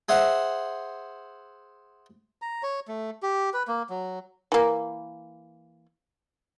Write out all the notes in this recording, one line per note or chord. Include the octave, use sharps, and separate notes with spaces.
G#4 C5 E5 F#5
A#5
C#5
A3
G4
B4
A#3
F#3
E3 A#3